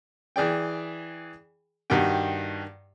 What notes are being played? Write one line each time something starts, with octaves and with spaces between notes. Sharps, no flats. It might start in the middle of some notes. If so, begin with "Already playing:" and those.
E3 G#4 D5 G5
G2 D#3 F#4 G4 G5